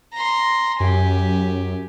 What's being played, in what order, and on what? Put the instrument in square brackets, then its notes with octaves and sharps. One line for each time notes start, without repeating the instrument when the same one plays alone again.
[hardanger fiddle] A#5 C6
[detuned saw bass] F#2 [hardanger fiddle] G4 G#5